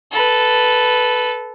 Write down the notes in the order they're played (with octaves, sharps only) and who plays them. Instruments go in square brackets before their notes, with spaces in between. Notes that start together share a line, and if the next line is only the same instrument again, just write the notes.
[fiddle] A4 B4